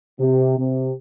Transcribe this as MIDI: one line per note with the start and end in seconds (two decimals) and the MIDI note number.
0.20 0.57 48
0.59 0.91 48